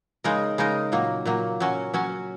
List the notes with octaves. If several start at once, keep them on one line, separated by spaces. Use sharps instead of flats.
C#3 G#3 D#4 A#4
C#3 G#3 D#4 A#4
A#2 F#3 A#3
A#2 F#3 A#3
F#3 C#4 F#4
F#3 C#4 F#4